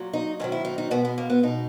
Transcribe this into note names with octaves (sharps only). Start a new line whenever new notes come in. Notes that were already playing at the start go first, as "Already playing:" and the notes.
Already playing: A#2 F#3
D#4
G#2 D#3 F#3 C#4
E4
D#4
D#4
B2 G#3 B3
B3
A#3
B3
B2 G#3 D#4